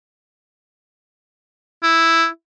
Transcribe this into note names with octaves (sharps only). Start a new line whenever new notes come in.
E4